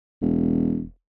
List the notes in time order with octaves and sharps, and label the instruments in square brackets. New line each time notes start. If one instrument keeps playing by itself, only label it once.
[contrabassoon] E1